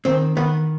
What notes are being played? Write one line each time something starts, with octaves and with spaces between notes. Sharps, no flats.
D#3 C4
D#3 B3